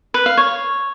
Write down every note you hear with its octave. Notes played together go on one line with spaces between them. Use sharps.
B4
F5
C#5